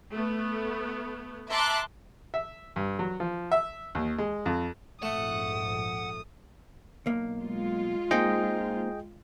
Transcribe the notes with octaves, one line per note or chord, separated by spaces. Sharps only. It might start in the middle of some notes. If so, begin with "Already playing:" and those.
A3 B3
E5 A5 A#5 C6 D6 F#6
E5
G2
F#3
F3
E5
D#2
G#3
F2
A#1 F2 G#2 A3 F#5 D#6
B1 A#3
G#3 F4
A#3 C4 D#4 G#4 D#5 G5